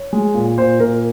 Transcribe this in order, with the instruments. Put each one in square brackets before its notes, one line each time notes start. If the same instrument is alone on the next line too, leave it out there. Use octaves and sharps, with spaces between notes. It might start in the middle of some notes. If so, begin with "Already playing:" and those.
Already playing: [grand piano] C#5
G#3
A#2
A#2 C5
A#2 A#4